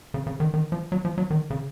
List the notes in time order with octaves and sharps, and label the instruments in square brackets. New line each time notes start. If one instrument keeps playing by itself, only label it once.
[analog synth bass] C#3
C#3
D#3
D#3
F3
F#3
F3
F#3
D#3
C#3